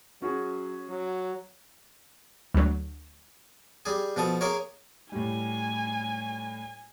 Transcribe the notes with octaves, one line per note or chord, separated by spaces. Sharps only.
F#3 C#4 F#4 G#4
F#3
D2 F#3
G3 G#4
B2 F3 A4 D#6
A#3 G#4 A#4 C#5
A2 G3 G#5